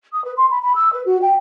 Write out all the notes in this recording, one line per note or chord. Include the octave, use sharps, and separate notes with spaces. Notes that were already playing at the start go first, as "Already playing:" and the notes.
D#6
B4
C6
B5
B5
E6
B4
F#4
G5